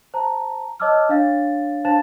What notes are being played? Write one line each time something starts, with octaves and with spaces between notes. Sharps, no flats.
C5 A5 A#5
C#5 D#5 A5 D6 E6 F6
D4 C#5 F5 A6
D4 C5 F5 A5 A6 E7